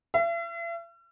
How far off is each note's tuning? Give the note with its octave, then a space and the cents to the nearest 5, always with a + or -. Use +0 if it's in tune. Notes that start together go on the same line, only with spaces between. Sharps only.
E5 +45